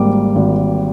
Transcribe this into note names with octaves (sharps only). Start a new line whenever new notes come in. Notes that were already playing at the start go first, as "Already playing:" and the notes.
Already playing: G#1 G#2 G3 A#3 D6
G#1